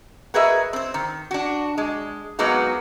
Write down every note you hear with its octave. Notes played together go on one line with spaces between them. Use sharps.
F#4 G#4 A#4 B4 D#5 E5
C4 C5
D#3
D4 F#4
G#3
F#3 G#3 A#3 B3 D#4 F#4